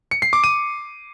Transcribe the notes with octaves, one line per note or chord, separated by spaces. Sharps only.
C#7
C7
D6
D#7